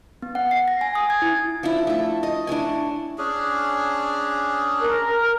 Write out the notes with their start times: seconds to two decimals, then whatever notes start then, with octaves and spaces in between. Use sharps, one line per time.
0.22 B3
0.35 F#5
0.51 C7
0.68 A#6
0.81 G#5
0.95 D#6
1.10 G#6
1.22 E4
1.63 F3 D4 E4
1.87 A3 A4
2.23 D#5
2.47 D4 E4 C#5 G#5
3.18 C#4 D4 G#4
4.80 A#4